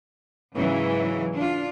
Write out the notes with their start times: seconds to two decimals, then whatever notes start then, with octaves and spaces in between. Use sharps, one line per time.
0.54 G#2 C#3 E3 F#3
1.33 D4 F4